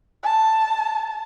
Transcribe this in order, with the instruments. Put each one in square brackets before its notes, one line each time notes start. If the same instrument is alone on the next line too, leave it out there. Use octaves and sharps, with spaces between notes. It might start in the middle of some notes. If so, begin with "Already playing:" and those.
[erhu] A5